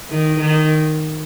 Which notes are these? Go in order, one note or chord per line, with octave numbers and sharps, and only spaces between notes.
D#3
D#3